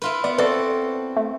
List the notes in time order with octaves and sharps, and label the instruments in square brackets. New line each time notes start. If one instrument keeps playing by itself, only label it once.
[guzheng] E4 F4 B4
[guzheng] B3 [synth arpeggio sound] D5
[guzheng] C4 F#4 A4 [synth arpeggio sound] B4 D5
[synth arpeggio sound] A3